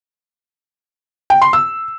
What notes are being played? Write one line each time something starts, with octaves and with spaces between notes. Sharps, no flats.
G5
C6
E6